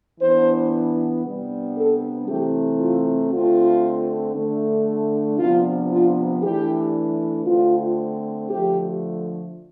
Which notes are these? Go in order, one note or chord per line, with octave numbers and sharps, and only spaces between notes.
E3 B3 D4 C5
C3 G3 B3 D4
A4
C3 E3 A3 C4 G4
F4
D3 A3 C4 F4
D3 A3 D4
C3 F3 B3 D4 F4
F4
E3 A3 D4 G4
D3 A3 C4 F4
D3 F3 A3 G4